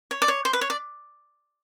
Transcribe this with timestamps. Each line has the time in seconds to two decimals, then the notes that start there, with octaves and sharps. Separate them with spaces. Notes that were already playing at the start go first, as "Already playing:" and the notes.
0.11 C#5
0.22 D5
0.28 C#5
0.45 C5
0.53 B4
0.61 C#5
0.70 D5